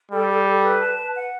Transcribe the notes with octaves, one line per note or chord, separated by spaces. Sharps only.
G3 A4
A4
A4
B4
A5
B4
F#5